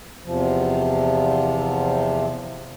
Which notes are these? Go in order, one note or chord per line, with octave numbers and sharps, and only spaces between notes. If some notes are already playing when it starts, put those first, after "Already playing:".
E2 C3 F3